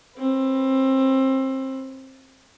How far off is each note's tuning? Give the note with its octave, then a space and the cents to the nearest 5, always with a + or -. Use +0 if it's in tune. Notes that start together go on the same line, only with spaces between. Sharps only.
C4 +25 B4 +20